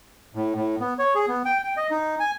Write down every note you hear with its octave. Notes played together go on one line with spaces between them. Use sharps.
A2
A2
B3
C#5
G#4
B3
G5
G5
D#5
D#4
G#5